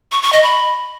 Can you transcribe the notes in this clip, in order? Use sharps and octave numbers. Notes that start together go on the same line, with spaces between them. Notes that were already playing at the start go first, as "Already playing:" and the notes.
C#6
C#6
D#5
B5